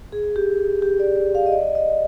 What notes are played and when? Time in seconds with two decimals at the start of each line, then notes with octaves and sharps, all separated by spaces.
0.12 G#4
0.36 G4
0.82 G4
1.00 D5
1.35 F5
1.46 D#5
1.52 D5
1.75 D#5